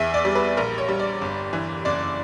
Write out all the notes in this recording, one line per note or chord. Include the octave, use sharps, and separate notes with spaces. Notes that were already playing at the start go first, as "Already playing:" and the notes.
Already playing: E2 E5
D5
G3
B4
A#1 A#4
C#5
G3
D5
G1
E3
F#1 D5